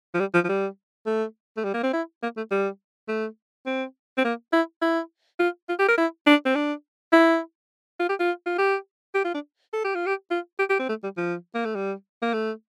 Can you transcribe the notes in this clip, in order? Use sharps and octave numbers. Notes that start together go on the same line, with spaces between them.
F3
G3
F3
F3
G3
A3
A3
G3
A#3
C4
E4
A#3
A3
G3
A3
C4
C4
A#3
E4
E4
F4
F4
G4
A#4
E4
D4
C4
D4
E4
F4
G4
F4
F4
G4
G4
F4
D4
A4
G4
F4
G4
F4
G4
G4
C4
A3
G3
F3
A#3
A3
G3
A#3
A3